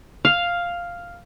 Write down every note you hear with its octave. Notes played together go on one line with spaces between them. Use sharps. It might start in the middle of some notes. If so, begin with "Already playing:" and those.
F5